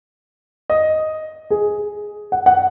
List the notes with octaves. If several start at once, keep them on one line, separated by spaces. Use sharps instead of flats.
D#5
G#4
F#5
F#5